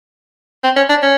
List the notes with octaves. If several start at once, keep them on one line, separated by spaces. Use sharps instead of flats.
C4
C#4
D4
C#4